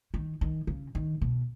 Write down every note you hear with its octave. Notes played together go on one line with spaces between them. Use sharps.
D#3
D#3
C#3
D#3
B2